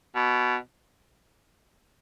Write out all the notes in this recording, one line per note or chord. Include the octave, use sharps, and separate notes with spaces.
B2